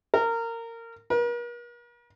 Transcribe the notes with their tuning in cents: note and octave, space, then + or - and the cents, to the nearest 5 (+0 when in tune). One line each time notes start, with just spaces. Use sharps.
A#4 -20
A#4 +45